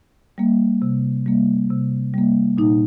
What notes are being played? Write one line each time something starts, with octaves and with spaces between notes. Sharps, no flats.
G3 A#3
C3
G3 A#3
C3
G3 A#3
A#2 D#4